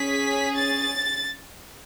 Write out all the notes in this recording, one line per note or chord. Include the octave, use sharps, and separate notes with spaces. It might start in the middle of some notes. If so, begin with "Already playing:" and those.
Already playing: C#4 G#4 B6
A6